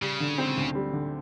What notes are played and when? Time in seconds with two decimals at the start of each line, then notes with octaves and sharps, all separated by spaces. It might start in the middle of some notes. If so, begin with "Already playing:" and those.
0.02 C#3 G3
0.20 D3
0.38 C4
0.57 D2
0.75 G3
0.93 D3